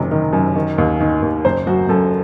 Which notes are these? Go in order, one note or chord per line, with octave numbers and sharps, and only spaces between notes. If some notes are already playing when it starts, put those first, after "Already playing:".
Already playing: F#1 C3 D#3
D#3
F#2
D#3
D#2
D#3
D#2
F#1 C5
F#2 F#4
F#2 A4